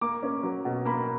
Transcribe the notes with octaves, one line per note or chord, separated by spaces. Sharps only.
A#3 D6
C#4
F#3
B2
A#3 B5